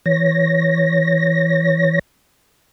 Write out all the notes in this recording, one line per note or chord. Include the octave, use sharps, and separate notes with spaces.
E3 C#5 A#6